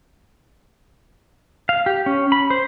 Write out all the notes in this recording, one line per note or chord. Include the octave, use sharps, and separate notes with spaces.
F5
G4
C#4
B5
C5